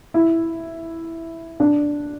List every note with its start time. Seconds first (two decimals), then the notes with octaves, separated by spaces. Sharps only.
0.14 E4
1.60 D4